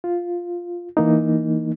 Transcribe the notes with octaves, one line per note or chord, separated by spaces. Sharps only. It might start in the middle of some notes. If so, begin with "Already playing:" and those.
F4
E3 A#3 D#4